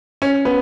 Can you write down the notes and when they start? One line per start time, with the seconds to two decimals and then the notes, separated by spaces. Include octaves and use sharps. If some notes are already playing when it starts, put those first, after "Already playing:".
0.22 C#4
0.45 B3